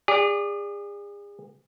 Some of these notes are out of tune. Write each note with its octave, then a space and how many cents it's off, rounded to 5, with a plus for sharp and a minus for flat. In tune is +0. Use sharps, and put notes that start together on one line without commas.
G#4 -35 D5 +0